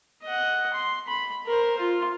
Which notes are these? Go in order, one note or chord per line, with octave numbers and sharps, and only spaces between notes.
D#5 F#5
C6
B5
A#4 C5
F4